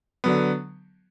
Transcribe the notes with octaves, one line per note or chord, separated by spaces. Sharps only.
D3 F#3 B3